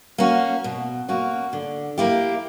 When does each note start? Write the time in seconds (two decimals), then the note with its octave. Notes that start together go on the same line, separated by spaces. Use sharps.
0.18 A#3 C#4 F#4
0.64 B2
1.09 A#3 C#4 F#4
1.53 D3
1.98 A#3 E4 G4